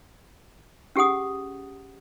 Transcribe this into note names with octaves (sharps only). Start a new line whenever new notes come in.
C#4 G4 G#4 F#5 D#6